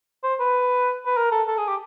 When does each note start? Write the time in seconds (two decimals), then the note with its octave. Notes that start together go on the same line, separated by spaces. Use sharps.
0.23 C5
0.40 B4
1.06 B4
1.17 A#4
1.32 A4
1.47 A4
1.57 G#4
1.68 G4